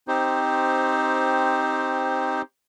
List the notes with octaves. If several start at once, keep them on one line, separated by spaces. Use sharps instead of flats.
C4 D#4 G4 C5